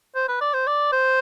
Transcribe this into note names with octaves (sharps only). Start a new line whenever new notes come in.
C5
B4
D5
C5
D5
C5